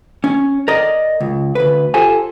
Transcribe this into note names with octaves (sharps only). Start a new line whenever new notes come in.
C#4
A#4 D5 D#5
C#2
D2 B4
F4 G4 A4 C5 G#5